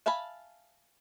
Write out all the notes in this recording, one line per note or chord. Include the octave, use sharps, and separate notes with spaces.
E5 F5 G#5 A5 B5